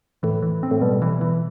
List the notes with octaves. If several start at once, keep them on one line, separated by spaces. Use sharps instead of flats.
A2 E3
E3
C4
A2
B2 G3
E3
E3